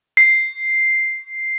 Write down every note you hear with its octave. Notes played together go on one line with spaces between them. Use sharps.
C7